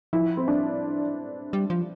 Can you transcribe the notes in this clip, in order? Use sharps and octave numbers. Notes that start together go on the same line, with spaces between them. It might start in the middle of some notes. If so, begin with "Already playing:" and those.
F3 E4
C4
D4
G3
F3